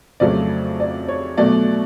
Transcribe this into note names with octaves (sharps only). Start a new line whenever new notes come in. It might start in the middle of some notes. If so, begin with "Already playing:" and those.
F2 C#3 F#3 A3 D5
D5
C#5
B2 F#3 A3 D5